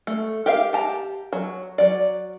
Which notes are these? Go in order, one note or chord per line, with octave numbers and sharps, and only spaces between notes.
A3
G4 A#4 E5 F5
G4 A5 A#5
F#3
F#3 D5